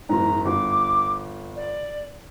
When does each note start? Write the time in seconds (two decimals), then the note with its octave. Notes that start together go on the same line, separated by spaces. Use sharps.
0.09 F#1 E2 G#2 A#5
0.45 G1 D6
1.56 D5